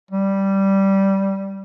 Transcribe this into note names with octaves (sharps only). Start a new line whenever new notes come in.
G3